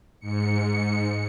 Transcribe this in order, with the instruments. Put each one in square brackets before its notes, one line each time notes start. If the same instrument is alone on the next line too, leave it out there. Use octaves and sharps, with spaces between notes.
[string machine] G#2 C#7